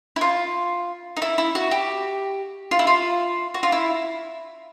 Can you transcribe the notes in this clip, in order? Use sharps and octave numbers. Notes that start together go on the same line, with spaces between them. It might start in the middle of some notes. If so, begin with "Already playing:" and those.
E4
F4
D#4
E4
E4
F#4
G4
F4
E4
F4
F#4
F4
E4